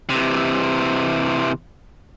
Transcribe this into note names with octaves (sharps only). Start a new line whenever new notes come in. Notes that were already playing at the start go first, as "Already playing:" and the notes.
C3 E3